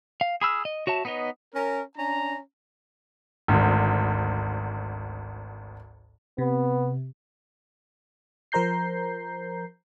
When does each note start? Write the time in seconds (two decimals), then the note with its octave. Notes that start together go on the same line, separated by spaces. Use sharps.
0.21 F5
0.41 G#4 B5 E6 F6
0.65 D#5
0.87 F#4 C#5 E5 A5
1.05 B3 D#4 B4 C#5 D#5
1.55 C#4 A#4
1.97 C#4 D4 A#5
3.48 G#1 D2
6.38 C3 B3
8.52 F3 A#4 C5 A#5 G6 C7